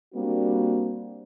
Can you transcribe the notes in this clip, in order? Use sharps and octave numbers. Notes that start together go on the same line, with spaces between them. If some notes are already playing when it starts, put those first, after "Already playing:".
G3 A#3 C4 D4 F#4